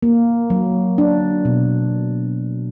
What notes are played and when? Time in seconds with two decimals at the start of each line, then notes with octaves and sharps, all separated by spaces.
0.02 A#3
0.50 F#3
0.98 D4
1.45 B2